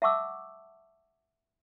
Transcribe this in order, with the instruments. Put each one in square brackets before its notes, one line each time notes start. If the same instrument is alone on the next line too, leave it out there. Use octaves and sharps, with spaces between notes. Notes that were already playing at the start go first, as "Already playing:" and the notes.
[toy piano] E5 F#5 A5 C#6 D6 E6